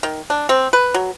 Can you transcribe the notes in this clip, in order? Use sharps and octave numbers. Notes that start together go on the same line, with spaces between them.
D#3
D4
C4
B4
F#3